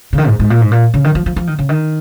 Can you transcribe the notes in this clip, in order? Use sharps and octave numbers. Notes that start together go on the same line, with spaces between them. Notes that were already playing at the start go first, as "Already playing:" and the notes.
C#3
D#3
G#2
G#2
A#2
G#2
A#2
C#3
D#3
F3
F3
F3
D#3
C#3
D#3